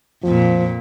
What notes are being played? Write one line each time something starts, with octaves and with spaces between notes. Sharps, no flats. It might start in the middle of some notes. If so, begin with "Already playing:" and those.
F2 A#2 F3